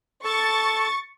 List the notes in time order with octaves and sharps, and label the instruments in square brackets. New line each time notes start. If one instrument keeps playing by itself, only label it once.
[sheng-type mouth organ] A4 A5 [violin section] C#6 A6